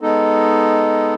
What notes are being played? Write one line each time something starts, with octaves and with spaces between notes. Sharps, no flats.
G#3 B3 D#4 A4